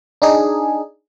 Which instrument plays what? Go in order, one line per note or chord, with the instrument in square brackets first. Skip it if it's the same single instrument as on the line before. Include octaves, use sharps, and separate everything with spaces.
[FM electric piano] D4 D#4 G#4